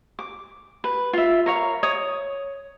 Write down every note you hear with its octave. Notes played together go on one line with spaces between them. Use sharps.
D6
B4
F4 E5
A#4 C#5 F5
C#5 D#6